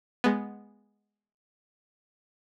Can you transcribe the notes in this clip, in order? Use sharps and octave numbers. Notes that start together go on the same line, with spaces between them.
G#3 B3